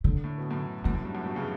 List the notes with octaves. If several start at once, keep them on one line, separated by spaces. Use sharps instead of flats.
D3
A2
B2
F#2 A2
F#2 A2 E3
F#2
G2
F#2 A2
G2 B2
A2 C#3